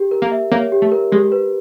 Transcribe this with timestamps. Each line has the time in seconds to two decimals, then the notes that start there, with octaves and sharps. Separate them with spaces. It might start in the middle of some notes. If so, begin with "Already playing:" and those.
Already playing: G4
0.11 A#4
0.22 A#3
0.32 E5
0.52 A#3 C#5
0.72 G4
0.82 A3
0.92 A#4
1.12 G#3 G4
1.32 B4